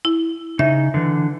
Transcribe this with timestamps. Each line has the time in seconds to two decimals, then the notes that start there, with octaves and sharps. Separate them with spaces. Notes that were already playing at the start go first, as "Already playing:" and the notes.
0.05 E4
0.59 C#3 D#4 E5
0.94 D3 E3